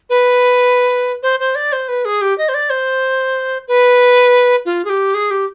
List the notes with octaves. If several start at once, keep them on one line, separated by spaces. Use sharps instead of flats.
B4
C5
C5
D5
C5
B4
G#4
G4
D#5
C5
D5
C5
B4
F4
G#4
G4
G#4
G4